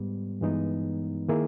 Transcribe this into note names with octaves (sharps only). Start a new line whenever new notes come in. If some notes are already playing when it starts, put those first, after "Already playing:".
Already playing: G#2 G3 B3
G2 E3 G#3 B3 D#4
D#3 A#3 E4 G#4